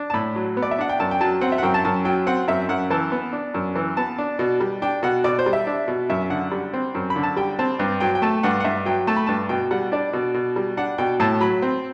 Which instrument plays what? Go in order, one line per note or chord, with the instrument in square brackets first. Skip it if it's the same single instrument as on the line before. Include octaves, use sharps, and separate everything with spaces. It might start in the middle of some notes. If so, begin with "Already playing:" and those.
Already playing: [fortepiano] D4
A5
A2 B5
F#3
B3
D5
E5
D4 F#5
G5
F#2 A5
G5
F#3 A5
C4 F#5
E5
F#5
F#2 G5
A5
F#2 A5
F#3 G5
C4 F#5
F#2 E5
F#2 F#5
E3 A5
B3
D4
F#2
E3
B3 A5
D4
B2
G3
D4 G5
B2 F#5
B2 D5
C5
G3
E5
D4
B2
F#2 E5
D3 F#5
G3
C4
F#2
B5
D3
A5
G3 G5
C4 A5
G2
F#3 G5
G5
A3 A5
G2 F#5
F#5
G2 E5
F#3 G5
A3 A5
B5
G2 A5
B2 G5
G3 F#5
D4 D5
B2
B2
G3
D4 F#5
B2 G5
A2 A5
F#3 B5
C4